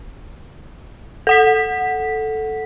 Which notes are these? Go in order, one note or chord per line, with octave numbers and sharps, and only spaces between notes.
A4 F#5 B6